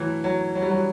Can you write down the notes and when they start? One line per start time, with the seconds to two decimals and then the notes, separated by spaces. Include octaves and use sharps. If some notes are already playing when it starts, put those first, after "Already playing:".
Already playing: E3 F#3 A3
0.24 F#3
0.55 F#3
0.62 G3
0.70 F#3